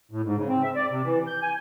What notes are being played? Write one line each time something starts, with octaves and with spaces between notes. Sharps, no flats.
A2
G#2
C#3
C4
E5
D5
C3
E3
G6
G#5